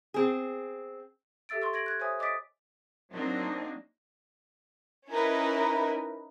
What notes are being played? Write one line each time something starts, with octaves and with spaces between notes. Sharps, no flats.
C4 G#4
G4 A4 E5 E6 A6 D7
C6 C#6 E6
G#6 A#6 D7 F#7
F#6 G#6
C5 C#5 E5 G#5 D#6
D#5 D6 D#6 A6 B6 D7
F#3 A#3 C4 D4 D#4
C#4 D#4 E4 A#4 B4